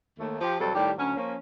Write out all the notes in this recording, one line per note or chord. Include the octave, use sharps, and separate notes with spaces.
D#2 A3
F3 G4
F2 C3 F#3 G3 A4
A2 D#3 G3 G4
D2 F#3 C#4
F3 A#3 C#4